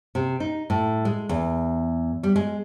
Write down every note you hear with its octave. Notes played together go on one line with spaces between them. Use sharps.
C3
D#4
A2
G#3
E2
G3
G#3